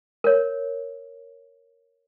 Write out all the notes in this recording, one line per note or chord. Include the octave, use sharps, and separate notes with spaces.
A#4 C#5